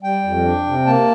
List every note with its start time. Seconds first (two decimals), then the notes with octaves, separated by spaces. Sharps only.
0.03 G3 G5
0.24 F2
0.45 D4
0.66 C3
0.86 A#3 A5